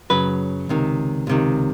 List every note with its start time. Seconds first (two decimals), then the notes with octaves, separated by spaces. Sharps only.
0.10 F#2 C#3 F#3 B4
0.69 C#2 C3 D#3
1.27 C#2 C3 D#3